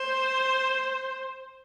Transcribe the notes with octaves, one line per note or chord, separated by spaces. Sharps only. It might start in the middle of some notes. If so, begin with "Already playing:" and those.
Already playing: C5